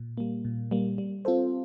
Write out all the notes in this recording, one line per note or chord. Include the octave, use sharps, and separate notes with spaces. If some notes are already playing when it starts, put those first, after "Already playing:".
Already playing: A#2
G3 A#3
A#2
G3 A#3
G3
C4 F4 A4 C5